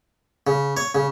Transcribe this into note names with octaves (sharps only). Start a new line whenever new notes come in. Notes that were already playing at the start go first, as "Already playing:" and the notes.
C#3
C#5
C#3